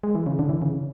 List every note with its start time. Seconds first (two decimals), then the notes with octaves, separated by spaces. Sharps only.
0.03 G#3
0.15 E3
0.26 C#3
0.39 D3
0.49 E3
0.62 C#3